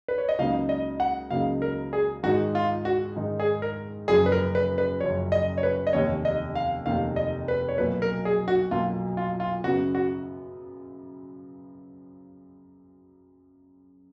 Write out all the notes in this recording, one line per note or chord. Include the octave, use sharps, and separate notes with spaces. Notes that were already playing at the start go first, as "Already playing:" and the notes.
B4
C#5
D#5
C#2 C#3 F#3 A#3 D#4 F5
D#5
F#5
C#2 C#3 F#3 A#3 D#4 F5
A#4
G#4
G#2 D#3 G#3 D#4 F#4
F4
F#4
G#2 D#3 G#3 D#4
G#4
A#4
F#1 F#2 F3 G#4
B4
A#4
B4
B4
F#1 F#2 F3 C#5
D#5
C#5
B4
D#5
F1 D#2 D#3 A#3 C#5
D#5
F5
F1 D#2 D#3 A#3 F5
D#5
B4
C#5
B1 B2 F#3 A#3 B4
A#4
G#4
F#4
B1 B2 F#3 A#3 F4
F4
F4
F#2 C#3 F#3 B3 F#4
F#4